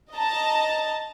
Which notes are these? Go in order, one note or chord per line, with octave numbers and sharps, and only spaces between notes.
D#5 A5 A#5